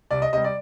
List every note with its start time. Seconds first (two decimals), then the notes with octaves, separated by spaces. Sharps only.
0.11 C2 D5
0.22 D#5
0.33 C3 G3 D#5
0.44 D5